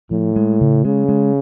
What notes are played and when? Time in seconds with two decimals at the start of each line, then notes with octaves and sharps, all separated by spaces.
0.11 A2 F3
0.36 G#3
0.61 C#3
0.85 C#3 G#3
1.09 G#3